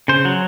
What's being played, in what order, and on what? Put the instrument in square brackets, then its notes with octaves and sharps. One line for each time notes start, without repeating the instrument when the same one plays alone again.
[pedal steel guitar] C#3 C5
F#3